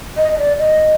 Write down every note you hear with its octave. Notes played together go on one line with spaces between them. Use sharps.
D#5
D#5
D5
D#5